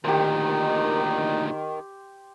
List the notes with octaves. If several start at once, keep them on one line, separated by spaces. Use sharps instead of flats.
D2 A#2 D#3 D#4 G4 C5